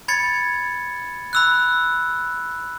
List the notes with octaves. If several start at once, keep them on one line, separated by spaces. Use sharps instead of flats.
B5 G#6 A6 C#7
B5 E6 F#6